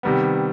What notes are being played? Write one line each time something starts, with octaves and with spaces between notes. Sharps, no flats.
C3 D#3 G3 B3